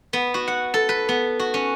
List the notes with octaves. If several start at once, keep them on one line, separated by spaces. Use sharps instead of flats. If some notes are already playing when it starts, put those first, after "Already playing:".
B3
F#4
F#5
A4
B4
B3
F#4
C#4